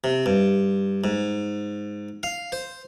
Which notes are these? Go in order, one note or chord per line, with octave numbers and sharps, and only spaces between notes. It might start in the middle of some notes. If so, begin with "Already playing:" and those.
C3
G2
G#2
F5
C5